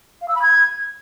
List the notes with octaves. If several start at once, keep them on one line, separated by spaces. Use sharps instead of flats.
F5
E6
B5
G#6